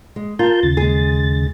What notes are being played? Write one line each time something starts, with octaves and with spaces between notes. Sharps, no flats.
G#3
F4 A#4 A5 G6
D#2 C#3 A6
G#3 G#4